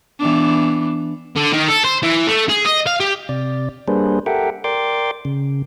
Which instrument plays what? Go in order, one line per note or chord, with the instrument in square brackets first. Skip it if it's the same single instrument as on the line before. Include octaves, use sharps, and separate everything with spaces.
[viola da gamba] E3 B3 D4
[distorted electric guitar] D3
D#3
A4
C5
E3
A3
G#4
D#5
F5
G4
[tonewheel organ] C3 D5
G3 A#3 D4 G#4 B4 C5
G4 A4 A#4 E5 F#5 G5
A#4 D5 G5 C6 D6
C#3